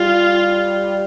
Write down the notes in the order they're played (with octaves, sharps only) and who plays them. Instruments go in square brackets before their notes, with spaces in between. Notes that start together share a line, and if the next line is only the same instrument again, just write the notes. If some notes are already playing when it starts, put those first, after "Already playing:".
Already playing: [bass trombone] G3 [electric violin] F4